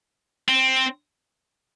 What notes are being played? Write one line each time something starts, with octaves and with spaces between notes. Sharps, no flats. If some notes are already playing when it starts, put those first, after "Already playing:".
C4